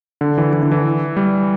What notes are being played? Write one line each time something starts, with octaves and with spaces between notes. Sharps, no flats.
D3
E3
E3
D3
E3
G3